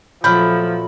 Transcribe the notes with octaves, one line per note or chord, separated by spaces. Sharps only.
A#2 F3 F#3 A3 B5 F6 G6